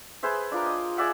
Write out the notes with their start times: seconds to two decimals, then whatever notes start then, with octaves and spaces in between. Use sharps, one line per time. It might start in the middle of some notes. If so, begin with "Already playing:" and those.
0.23 G#4 B4 C5 E5
0.51 D4 F4 A#4
0.66 D#5
0.97 G#4 D5 E5 F#5